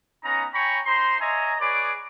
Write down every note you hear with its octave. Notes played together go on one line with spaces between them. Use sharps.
B3 C#4 D#4 A#5
C#5 G5 G#5 A#5 B5 C#6
D#4 C5 A#5 C6
C#5 D#5 E5 G#5 A#5
G#4 B4 C#5 D5 D6